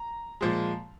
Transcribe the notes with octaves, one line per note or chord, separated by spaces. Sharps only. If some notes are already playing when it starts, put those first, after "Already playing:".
Already playing: A#5
A#2 F3 G#3